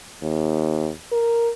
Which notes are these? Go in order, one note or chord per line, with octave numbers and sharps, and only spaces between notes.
D#2
A#4